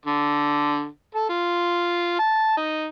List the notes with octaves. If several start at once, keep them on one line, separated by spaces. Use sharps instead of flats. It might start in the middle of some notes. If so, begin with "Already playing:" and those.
D3
A4
F4
A5
D#4